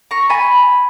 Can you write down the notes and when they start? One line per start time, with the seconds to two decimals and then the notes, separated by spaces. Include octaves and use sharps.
0.11 A#5 C#6
0.30 G#5 B5